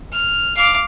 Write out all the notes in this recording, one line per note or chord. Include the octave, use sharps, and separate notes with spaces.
F6
F5 D6